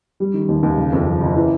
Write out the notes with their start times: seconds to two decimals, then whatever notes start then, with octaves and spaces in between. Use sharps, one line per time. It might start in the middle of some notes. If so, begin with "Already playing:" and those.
0.20 G3
0.34 D#3
0.48 D#2
0.63 D#2
0.77 C#3
0.92 F2
1.07 F3
1.21 F#1
1.36 E3